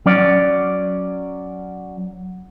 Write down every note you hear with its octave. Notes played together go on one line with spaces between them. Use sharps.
F#3 C#4 D5